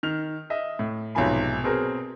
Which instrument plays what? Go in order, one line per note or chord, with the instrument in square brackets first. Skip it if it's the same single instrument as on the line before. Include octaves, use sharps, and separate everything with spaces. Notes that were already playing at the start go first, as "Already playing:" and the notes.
[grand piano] D#3 F6 F7
D#5 E5
A2
B1 G#2 C3 F3 G#5 B5
B2 C4 G#4 A#4